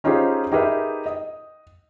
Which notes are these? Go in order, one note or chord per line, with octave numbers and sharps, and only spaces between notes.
C#4 D#4 F4 G4 G#4 C5
D#4 G4 G#4 A#4 B4 E5
D#5